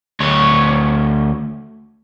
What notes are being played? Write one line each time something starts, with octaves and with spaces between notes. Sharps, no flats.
D2 C#5